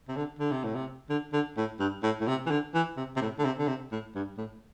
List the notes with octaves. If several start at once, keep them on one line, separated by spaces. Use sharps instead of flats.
C3
D3
D3
C3
A2
C3
D3
D3
A2
G2
A2
A2
C3
E3
D3
E3
C3
C3
A2
D3
C3
D3
C3
A2
G2
A2